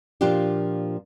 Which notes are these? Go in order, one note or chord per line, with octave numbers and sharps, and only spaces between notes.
A#2 F3 D4 F4 G4